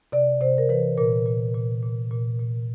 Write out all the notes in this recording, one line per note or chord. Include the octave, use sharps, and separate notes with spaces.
C3 D5
C3 C5
A#4
E3 B4
A#2 A#4
A#2
A#2
A#2
A#2
A#2